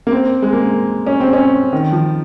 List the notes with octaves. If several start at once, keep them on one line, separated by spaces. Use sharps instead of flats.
A#3
C4
G#3
A#3
C#4
C4
C#4
D#3
F3